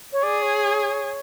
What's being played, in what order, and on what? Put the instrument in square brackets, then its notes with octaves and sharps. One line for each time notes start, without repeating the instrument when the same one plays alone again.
[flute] C#5
[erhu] G#4 [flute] D5
[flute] C#5